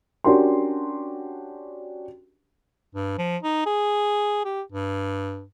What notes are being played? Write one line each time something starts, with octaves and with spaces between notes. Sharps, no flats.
C#4 D4 F#4 G4 A#4 C6
G2
F3
D#4
G#4
G4
G2